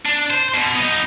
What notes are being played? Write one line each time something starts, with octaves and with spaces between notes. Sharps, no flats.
D4
C5
B2
B3 D#4